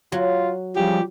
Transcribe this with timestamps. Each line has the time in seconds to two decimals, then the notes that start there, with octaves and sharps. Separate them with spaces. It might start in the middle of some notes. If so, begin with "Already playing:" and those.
0.12 F#3 F4
0.76 C#3 F3 G3 G4